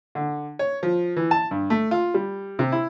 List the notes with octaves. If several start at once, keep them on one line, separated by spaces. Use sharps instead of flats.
D3
C#5
F3
E3
A5
G2
A3
F4
G3
C3
E4